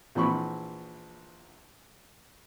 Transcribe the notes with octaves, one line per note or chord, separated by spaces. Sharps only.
A#1 E3 F3 B5 C#6